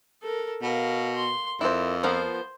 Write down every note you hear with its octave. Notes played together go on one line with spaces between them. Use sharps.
A4 A#4
B2 A#4 F5
C6
F2 E4 A#4 C5
F3 B3 A#4 C5